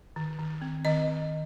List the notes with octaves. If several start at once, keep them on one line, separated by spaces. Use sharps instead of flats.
D#3
D#3
C4
D#3 D#5
D#3